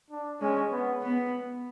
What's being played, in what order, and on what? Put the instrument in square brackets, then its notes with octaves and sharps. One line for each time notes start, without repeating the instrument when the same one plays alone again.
[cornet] D4
[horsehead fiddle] G#3 [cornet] C#4
[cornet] B3
[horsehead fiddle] B3